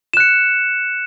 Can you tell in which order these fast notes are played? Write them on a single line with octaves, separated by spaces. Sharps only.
E7 F#6 C#7